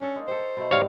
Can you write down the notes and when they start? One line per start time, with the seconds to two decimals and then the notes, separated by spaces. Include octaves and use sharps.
0.01 C#4 D4 A4
0.16 G#3 A#3 D#4
0.28 G4 A4 C5
0.40 C#5
0.57 B2 A3
0.71 G#2 G3 C4 C#5 F5